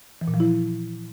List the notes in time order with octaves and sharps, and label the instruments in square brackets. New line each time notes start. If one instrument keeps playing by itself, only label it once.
[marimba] E3
A#2
F3
E4